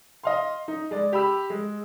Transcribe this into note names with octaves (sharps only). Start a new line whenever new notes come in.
D#5 F5 C6
D#4
G#3 D5
G4 B5 E6
G#3